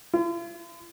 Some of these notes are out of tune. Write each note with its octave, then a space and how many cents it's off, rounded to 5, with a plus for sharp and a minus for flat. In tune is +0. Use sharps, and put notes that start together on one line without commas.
F4 -45